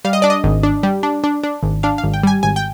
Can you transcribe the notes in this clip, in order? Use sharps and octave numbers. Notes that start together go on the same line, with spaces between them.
G3 F5
D#5
D4 D5
D#5
G#1
D4
G3
D4
D4
D4
G#1
D4 F5
F5
G#1
G5
G3 G#5
G#1 G#5
G5